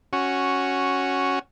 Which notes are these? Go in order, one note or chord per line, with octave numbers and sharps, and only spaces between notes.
C#4 F#4